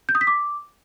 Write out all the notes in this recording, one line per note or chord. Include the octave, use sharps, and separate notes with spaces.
G6
D#6
B6
D6